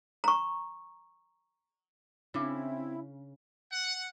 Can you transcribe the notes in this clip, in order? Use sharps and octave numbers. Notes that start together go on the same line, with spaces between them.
A#5 C#6
C#3 C4 D4 E4 E5 D6
F#5